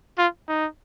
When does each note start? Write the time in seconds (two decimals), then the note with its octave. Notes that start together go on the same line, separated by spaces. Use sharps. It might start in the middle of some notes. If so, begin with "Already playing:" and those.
0.18 F4
0.48 D#4